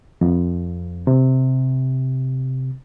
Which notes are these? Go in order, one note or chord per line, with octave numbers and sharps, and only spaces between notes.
F2
C3